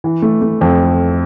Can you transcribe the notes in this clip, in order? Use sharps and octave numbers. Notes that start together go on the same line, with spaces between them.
E3
A3
A3
F2